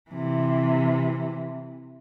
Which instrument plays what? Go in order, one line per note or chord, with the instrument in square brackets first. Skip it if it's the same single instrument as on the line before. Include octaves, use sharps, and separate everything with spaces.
[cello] C3 E3